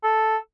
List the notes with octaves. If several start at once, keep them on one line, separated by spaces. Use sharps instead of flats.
A4